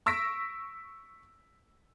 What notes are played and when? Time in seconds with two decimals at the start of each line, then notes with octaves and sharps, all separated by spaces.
0.06 C#6 E6 A#6 B6 D7